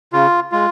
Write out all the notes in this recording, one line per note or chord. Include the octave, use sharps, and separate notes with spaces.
C#3 F4
G#3 F4